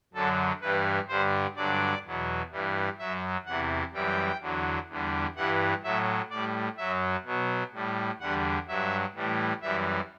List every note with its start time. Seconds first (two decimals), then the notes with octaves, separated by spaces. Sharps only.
0.13 F#2 D3 F#3 A4
0.61 G2 E3 G3 B4
1.08 G2 D3 G3 C5
1.56 G2 D3 F#3 D5
2.04 E2 B2 F#3
2.51 G2 E3 G3
2.99 F#2 F#3 E5
3.45 E2 C3 E3 F#5
3.93 F#2 E3 G3 G5
4.40 E2 D3 F#3
4.88 E2 D3 G3
5.36 G2 E3 G3 F#5
5.83 A2 F#3 E5
6.30 A2 G3 D5
6.77 F#2 F#3 E5
7.25 B2 F#3
7.73 A2 G3
8.20 E2 D3 G3 F#5
8.67 G2 F#3 E5
9.15 A2 E3 G3
9.62 F#2 E3 G3 E5